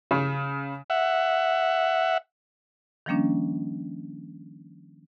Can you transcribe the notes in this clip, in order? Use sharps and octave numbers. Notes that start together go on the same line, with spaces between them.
C#3
E5 F#5
D#3 F3 G3 A#3 C#4 D4